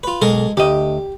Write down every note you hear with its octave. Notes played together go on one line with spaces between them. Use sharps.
F4 B4
B1 G#3 A4 A#4
D2 G4 D#5